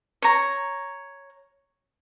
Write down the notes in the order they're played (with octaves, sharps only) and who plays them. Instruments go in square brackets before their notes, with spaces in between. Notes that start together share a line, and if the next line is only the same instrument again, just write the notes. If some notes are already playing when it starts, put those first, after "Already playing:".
[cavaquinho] C#5 A#5